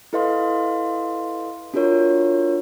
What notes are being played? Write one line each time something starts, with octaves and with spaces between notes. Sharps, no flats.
E4 A4 B4 D#5 F5 C6
D4 F4 F#4 A#4 C#5